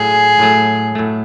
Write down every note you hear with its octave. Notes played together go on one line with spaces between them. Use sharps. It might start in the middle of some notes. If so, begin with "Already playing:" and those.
Already playing: A2 F#3 A3 G#4
A2 F#3 A3
A2 F#3 A3